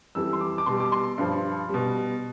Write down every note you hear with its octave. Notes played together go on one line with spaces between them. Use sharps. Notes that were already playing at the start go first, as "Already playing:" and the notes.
F2 E3 G3 E6
C6
D6
D6
B2 G3 C6
D6
C6
G2 F3
B2 G3